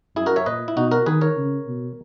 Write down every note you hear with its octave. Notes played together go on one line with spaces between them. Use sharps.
F#2 E4 G#4
F#4 A#4
C#5 E5
A#2 B4 D#5
E4
B2 D#4 F#4
F#4 A#4
D#3 G#4 B4
A#4 C#5
C#3
B2